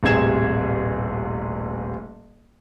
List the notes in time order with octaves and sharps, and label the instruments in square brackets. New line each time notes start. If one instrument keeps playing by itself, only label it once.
[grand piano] D#1 A1 C3 G#4 G#6 E7